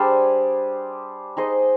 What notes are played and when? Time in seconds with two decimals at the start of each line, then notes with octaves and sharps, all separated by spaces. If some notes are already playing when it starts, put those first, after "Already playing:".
Already playing: G3 D4 G#4 C5
1.37 D#4 G#4 C5 D#5